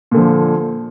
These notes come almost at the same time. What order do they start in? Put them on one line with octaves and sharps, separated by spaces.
A#2 D3 F3